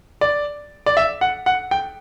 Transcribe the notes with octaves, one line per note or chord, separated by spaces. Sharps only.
D5
D5
E5
F#5
F#5
G5